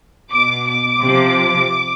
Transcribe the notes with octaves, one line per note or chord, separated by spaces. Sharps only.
B2 D6
D6
C3 F3